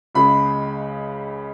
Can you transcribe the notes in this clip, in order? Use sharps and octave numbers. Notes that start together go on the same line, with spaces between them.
C#2 C#3 G#3 B5